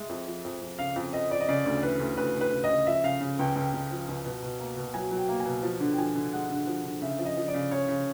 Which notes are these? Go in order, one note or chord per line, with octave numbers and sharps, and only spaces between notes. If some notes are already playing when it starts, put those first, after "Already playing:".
Already playing: G#3 E5
F2
F3
F2
F2
C#3 F5
F2
F2 D#5
F2 D5
D#5
C#3 D5
D2
E3 B4
D2
D2 B4
D2
B4
C#3
D#5
C#3
F3 E5
C#3 F5
C#3
C#2 G5
C#2 G5
C#2
F3
C#2
B2
B2
A#3
B2
F#3 G#5
F#3
G5
A#3
G#5
B2
F3
D3
G5
F3 G#5
D3
G#3 F#5
D3
F3
D3
C#3 E5
F3
D#5
F3
D5
C#3
C#3 C#5
C#3